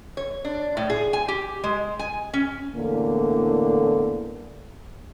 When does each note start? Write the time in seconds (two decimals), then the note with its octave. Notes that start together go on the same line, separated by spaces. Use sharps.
0.17 C#5
0.45 D4
0.77 A2
0.90 G#4
1.13 G#5
1.28 G4
1.64 G#3
1.99 G#5
2.33 C#4
2.75 E2 A2 D3 A#3